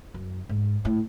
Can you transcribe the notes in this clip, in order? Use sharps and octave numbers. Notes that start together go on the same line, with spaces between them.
F#2
G#2
A2